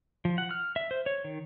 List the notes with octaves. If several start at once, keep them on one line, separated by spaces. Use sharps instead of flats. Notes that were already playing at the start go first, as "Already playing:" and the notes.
F3
F#5
F6
E5
C5
C#5
D#3